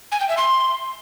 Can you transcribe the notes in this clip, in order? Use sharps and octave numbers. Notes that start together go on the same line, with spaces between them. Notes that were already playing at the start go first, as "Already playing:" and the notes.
G#5
G5
E5
C6